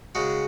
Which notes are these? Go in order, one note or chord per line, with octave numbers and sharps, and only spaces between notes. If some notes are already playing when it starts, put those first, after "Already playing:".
C#3 G#3 F#4